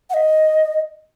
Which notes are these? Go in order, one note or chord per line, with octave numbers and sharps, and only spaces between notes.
F#5
D#5